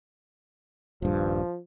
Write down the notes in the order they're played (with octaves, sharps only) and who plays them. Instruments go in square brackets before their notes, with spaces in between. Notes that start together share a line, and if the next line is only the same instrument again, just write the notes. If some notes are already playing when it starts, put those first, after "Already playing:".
[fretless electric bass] D#1 G2 [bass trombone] F3